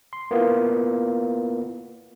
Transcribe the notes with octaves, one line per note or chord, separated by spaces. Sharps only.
C6
A#3 B3 E4 F4 A#4